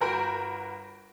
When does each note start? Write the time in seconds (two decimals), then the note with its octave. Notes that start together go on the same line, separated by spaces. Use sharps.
0.01 G1 F#4 A#4 B5 G6 D7